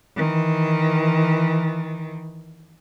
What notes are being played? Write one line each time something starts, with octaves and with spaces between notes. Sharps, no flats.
D#3 E3